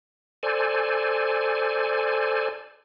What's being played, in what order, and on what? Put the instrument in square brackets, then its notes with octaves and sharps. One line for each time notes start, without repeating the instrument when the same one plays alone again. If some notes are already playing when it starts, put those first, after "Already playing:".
[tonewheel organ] A4 C5 D5 G#5